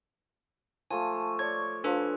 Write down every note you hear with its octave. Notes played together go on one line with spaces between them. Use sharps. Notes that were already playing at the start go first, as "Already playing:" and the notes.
F3 A3 G#5
C#5 D5 G#6
F3 D4 A4 B4 G#5